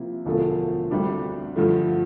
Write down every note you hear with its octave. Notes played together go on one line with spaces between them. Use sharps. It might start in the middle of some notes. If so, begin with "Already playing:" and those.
Already playing: C3 F3 A#3 E4
E1 D2 D3 F3 A3
D2 C3 G3 D4
G2 D3 F3 A3